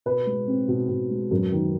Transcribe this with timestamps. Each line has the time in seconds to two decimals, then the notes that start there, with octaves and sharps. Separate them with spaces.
0.06 B2 B4
0.27 G#3
0.47 C4
0.68 B2
0.89 B2
1.10 G#3
1.31 F#2
1.52 D#3